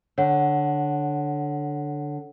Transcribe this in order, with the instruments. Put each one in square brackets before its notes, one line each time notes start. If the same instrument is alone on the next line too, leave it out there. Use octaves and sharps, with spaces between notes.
[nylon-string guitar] D3 [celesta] C#5 F#5